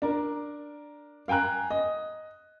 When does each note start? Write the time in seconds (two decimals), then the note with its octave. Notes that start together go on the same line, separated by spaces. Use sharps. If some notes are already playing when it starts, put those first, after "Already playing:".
0.02 D4 A#4
1.28 F5 G5 G#5 A#5 F#6
1.70 D#5